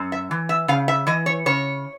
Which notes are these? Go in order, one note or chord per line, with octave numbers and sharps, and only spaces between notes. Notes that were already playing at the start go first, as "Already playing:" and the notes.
Already playing: F#2
E5
E3
E5
C#3 F5
E5
E3 D#5
C#5
C#3 C#5